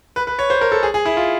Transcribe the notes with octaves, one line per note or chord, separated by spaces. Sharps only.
B4
B4
C#5
C5
A#4
A4
G#4
G#4
E4
F4